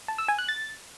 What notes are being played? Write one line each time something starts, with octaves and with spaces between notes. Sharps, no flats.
A5
E6
G#5
F#6
A6